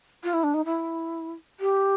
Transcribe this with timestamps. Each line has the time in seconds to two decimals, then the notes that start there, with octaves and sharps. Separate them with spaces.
0.23 F4
0.33 E4
0.43 D4
0.54 D#4
0.65 E4
1.60 G4